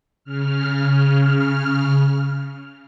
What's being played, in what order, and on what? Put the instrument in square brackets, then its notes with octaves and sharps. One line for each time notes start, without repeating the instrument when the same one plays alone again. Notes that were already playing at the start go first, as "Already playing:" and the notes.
[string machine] C#3 F6